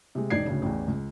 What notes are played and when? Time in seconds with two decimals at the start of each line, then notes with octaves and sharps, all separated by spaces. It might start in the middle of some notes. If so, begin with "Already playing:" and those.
0.15 C3 G#3
0.30 E1 D#4 D5 G#6 C7
0.46 D2 A2 C#3
0.62 A1 E2
0.88 C#2